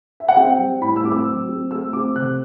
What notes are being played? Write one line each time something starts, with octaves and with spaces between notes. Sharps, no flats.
E5
F#5
C4 G5
G3
A2 B5
E6
C4 D6
E6
F#3
C4
A3 E6
C4 D6
C3 F#6